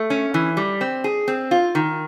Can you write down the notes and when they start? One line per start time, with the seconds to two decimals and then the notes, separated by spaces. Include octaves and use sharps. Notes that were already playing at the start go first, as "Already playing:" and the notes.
Already playing: A3
0.10 C#4
0.34 E3
0.57 G3
0.81 C4
1.04 G#4
1.28 C4
1.51 F4
1.75 D#3